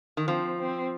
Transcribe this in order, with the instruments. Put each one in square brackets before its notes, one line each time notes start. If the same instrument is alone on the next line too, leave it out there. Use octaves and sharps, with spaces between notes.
[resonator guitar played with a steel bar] D#3
[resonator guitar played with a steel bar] F3 [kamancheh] C4
[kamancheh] C4